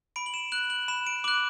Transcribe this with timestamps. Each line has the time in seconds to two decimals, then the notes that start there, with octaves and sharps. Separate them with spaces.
0.16 B5 D7
0.26 F#7
0.34 E7
0.52 F#6 F#7
0.70 F#7
0.88 B5 E7
1.07 D7
1.24 D6 F#6 F#7